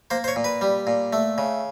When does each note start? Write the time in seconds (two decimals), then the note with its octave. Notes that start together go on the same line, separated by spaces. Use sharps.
0.11 A#3 C5
0.24 C5
0.28 C#5
0.36 A#2
0.44 B4
0.61 G3
0.87 A#2
1.13 A3
1.38 C#3